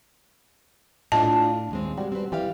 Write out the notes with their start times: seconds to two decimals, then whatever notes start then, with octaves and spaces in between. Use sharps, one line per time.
1.12 A2 D4 F4 D#5 A5
1.71 D#2 G#3 C4
1.97 G3 G#3 F#4
2.12 C4 B4
2.32 E3 G3 G4 F5